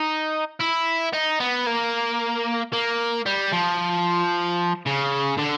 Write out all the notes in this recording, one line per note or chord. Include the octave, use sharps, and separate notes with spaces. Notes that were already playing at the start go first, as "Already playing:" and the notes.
Already playing: D#4
E4
D#4
B3
A#3
A#3
G3
F3
C#3
D3